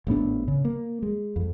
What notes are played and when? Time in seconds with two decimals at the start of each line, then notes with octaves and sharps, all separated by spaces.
0.07 G#1 A2 B3 D4
0.48 C#3
0.65 A#3
1.02 G#3
1.36 F2